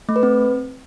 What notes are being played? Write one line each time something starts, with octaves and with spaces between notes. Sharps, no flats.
A3
B4
C4